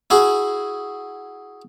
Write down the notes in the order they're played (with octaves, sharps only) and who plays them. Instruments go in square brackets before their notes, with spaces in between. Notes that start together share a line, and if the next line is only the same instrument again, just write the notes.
[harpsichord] E4 F#4 G#4